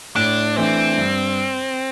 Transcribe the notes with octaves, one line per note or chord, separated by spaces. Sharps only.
A2 D4
E3 A3 C4 D4
G2